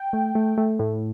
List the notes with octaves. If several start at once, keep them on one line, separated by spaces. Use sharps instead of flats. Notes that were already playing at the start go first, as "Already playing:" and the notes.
Already playing: G5
A3
A3
A3
A2